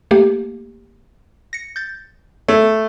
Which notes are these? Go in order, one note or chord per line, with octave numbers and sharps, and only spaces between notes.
A3 A#3 G4
A#6 C#7
G6 A6
A3 C#5